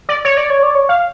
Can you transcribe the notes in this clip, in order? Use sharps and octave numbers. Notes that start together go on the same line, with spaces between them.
D5
C#5
D5
C#5
D5
C#5
F5